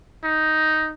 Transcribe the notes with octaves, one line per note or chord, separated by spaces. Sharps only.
D#4